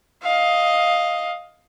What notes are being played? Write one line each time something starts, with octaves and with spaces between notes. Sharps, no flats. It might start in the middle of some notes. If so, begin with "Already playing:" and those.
D#5 F5